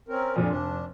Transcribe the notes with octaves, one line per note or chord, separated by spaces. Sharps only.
C4 C#4 A#4
F2 A#2 D3 F3
F1 D4